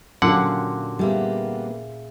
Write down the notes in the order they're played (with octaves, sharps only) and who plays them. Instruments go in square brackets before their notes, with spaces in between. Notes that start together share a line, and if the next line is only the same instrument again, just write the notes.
[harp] A#2 [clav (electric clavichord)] D3 F#5 [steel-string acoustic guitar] F#3 [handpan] C#4 F4 G4
[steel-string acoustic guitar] G3 A#3 B3 [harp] G#4 E5 F5